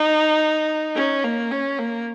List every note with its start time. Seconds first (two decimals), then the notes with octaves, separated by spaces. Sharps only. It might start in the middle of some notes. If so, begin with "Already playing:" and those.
Already playing: D#4
0.95 C#4
1.24 A#3
1.51 C#4
1.79 A#3